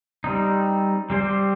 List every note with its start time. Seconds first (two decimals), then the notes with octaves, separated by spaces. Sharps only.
0.24 G3 C4 D#4
1.10 G3 C4 G4 C5